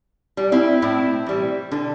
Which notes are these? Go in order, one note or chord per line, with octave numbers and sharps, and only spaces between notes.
G3
C4 E4
A2 C4 E4
E3 G3
D3